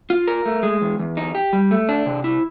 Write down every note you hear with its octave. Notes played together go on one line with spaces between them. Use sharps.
F4
A#4
A3
G#3
E2
E2
D#4
G4
G3
A3
D4
C3
E4